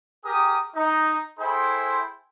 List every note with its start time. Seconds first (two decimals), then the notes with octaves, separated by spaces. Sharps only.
0.25 G4 G#4 A#4 D#6
0.76 D#4
1.39 E4 G#4 A4 C5 G5 C6